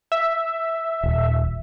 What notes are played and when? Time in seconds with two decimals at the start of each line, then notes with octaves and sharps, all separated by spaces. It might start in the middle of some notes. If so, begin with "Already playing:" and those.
0.12 E5
1.03 D#1